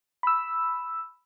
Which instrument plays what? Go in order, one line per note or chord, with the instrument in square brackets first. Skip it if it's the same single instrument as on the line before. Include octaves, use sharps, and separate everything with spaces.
[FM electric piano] B5 E6